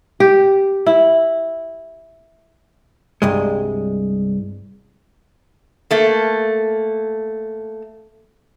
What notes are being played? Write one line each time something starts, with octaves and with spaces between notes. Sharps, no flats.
G4
E4
C2 G2 G#3
A3 A#3